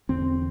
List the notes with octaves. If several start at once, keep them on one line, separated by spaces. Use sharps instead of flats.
E2 D3 C4